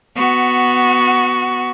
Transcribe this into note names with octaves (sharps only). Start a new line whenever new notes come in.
B3 F#4